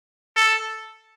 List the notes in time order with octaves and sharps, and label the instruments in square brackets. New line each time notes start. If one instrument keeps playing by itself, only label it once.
[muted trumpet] A4